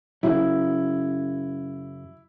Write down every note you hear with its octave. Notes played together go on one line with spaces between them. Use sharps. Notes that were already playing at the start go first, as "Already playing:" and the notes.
F#2 C#3 F#3 E4